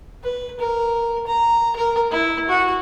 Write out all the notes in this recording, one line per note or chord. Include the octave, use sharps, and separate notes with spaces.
B4
A#4
A#5
A#4
E4
F#4